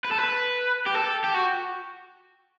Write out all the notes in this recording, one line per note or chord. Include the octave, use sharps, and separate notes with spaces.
B4
A4
B4
G4
A4
G4
F#4